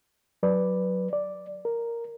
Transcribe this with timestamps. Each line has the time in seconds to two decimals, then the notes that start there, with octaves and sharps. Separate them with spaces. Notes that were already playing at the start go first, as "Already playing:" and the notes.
0.43 F#3 B4 D5
1.13 D5
1.65 A#4